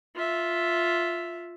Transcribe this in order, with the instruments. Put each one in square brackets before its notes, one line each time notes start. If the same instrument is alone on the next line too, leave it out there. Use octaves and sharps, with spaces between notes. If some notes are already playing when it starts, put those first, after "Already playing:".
[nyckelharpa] F4 E5